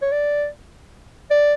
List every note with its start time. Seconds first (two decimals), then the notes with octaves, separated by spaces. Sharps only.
0.02 C#5
0.12 D5
1.31 D5